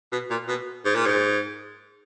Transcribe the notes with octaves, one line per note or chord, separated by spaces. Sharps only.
B2
A#2
B2
G#2
A#2
G#2